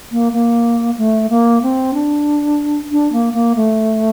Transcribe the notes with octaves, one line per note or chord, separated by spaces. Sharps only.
A#3
A#3
A3
A#3
C4
D4
D4
A#3
A#3
A3